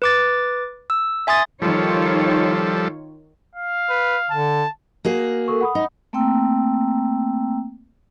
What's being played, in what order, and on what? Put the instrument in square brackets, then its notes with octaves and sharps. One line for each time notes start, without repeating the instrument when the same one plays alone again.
[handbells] B4 D6 A6
E6
E5 G#5 C6 D#6 A6
[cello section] D#3 F4 C#5 [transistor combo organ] F3 G3 A4
[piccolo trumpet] F5
[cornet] B4
[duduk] D3 [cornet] A5
[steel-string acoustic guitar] A#3 F#4 G#4
[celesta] A4 A#4 C#6
F#5 B5 D#6
[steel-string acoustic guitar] D#4
[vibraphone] A3 A#3 C4 G5 A#5 E6